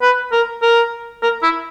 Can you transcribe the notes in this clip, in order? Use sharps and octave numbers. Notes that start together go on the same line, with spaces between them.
B4
A#4
A#4
A#4
E4